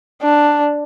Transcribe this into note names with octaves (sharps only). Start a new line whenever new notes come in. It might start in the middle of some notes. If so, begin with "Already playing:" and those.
D4